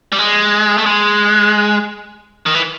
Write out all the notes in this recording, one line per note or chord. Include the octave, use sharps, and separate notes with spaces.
G3
G#3
A3
G#3
D#3
E3